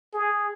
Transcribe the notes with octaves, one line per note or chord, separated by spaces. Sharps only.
G#4